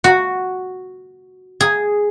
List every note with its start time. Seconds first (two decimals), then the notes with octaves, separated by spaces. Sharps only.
0.04 F#4
1.61 G#4